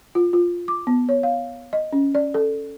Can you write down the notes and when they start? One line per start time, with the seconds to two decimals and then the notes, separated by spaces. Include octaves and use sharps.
0.15 F4
0.33 F4
0.68 D6
0.87 B3
1.09 C#5
1.23 F5
1.73 D#5
1.93 C#4
2.15 D5
2.34 A4